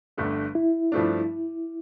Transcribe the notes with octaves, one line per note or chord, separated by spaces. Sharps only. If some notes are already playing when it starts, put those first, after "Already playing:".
G1 G2 D3 A3 D4
E4
G2 F3 A3 D4